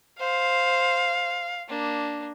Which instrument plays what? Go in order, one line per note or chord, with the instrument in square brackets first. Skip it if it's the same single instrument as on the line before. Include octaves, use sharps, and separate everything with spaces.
[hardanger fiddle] C5 [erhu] F5
[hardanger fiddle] A#3 D4